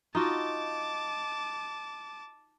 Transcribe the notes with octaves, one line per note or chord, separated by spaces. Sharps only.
D#4 F4 F#4 A5 D6